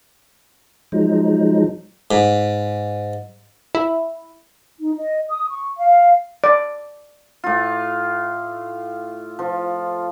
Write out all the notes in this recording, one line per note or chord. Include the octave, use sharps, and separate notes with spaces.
F3 F#3 G#3 D#4
G#2
E4
D#4
D#5
D#6
C#6
F5
D5
A2 F4
F3